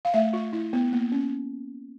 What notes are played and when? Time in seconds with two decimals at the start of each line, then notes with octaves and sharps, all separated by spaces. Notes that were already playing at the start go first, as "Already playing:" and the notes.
0.05 F5
0.14 A3 E5
0.33 F4
0.53 E4
0.73 B3
0.93 A#3
1.12 C#4